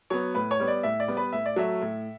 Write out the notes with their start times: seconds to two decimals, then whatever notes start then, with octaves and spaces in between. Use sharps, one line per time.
0.10 F#3 B3 C#5
0.35 A2 B4
0.51 C#5
0.60 G3 B3
0.68 D5
0.83 A2 E5
1.00 D5
1.08 G3 B3
1.17 B4
1.32 A2 E5
1.46 D5
1.56 F#3 A3 E5
1.82 A2